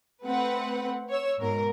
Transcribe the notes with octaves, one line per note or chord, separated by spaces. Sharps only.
A3 C4 B4 F#5
C#5 E6
G#2 B2 A#4